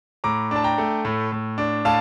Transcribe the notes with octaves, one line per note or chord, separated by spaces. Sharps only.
A2 A#5 D6
D4 A5
G5 A#5
A3
A2
A2
D4
A2 F5 A5